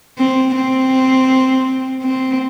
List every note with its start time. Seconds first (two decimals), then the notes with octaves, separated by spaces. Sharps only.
0.18 C4
0.55 C4
2.03 C4